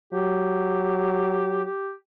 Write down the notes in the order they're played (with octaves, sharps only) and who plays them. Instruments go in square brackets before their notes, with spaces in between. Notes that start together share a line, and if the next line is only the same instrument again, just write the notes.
[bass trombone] F#3 [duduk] G4
[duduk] G4